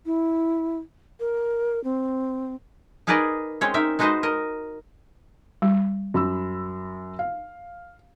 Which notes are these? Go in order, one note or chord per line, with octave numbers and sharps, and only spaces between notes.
E4
A#4
C4
D#4 G#4 A#4 B4 D5 D#5
G#3 C4 C#4 C#5
D#4 A#4 E5
G#3 D#4 F#4 B4 C5 D#5
A#4 D#5
G3
F#2 B5 E6
F5